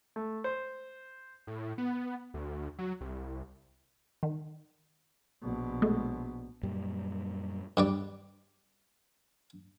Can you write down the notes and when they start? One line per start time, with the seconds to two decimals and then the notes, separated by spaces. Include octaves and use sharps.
0.16 A3
0.44 C5
1.47 A2
1.78 B3
2.34 D2
2.79 F#3
3.01 C2
4.23 D#3
5.41 A#1 B2
5.82 G#3 A3
6.63 F#2 A#2 G3
7.77 G2 G3 D5